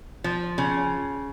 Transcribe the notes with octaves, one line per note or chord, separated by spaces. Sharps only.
F3
C#3